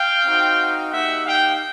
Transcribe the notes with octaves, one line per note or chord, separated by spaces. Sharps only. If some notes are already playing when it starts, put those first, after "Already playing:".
Already playing: F5 G5
C4 D#4 F#4
A#3 D#4 G4 E5 F#5
F5 G5